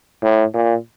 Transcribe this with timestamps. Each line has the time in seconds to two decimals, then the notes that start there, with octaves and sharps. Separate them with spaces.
0.23 A2
0.54 A#2